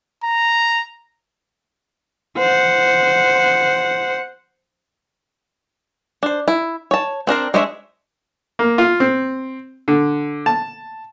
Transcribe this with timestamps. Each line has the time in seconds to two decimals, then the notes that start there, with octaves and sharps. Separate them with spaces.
0.24 A#5
2.37 C5 F#5
6.23 D4 C5
6.48 E4
6.91 C#5 A5
7.27 C4 D4 A#4 C5
7.54 G#3 D4 C5 C#5 E5
8.59 A#3
8.78 F4
9.00 C4
9.88 D3
10.46 A5